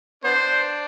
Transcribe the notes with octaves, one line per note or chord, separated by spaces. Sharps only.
B3 D4 C5